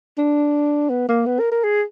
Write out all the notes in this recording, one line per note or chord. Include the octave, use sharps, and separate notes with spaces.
D4
B3
A#3
B3
A#4
A#4
G#4